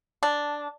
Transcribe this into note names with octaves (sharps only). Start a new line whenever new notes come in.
D4